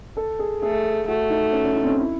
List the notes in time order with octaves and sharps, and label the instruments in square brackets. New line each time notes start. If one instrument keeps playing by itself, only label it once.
[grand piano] A4
G#4
[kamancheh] A3 [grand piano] G#4
[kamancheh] A3 [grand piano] F#4
[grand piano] D#4
C#4
C#4
D#4
C4
C#4
E4